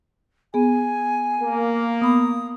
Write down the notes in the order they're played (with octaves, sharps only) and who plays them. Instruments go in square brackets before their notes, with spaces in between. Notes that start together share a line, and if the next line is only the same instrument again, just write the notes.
[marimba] B3 G#4 [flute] G#5
[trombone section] A#3
[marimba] B3 B5 [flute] D#6